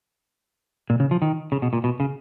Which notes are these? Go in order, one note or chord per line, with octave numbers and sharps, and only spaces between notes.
A#2
C#3
F3
D#3
C#3
B2
A#2
B2
C#3